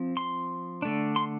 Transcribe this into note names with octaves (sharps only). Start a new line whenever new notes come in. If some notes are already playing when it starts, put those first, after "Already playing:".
Already playing: F3 C4
C6
D3 A3 D4
C6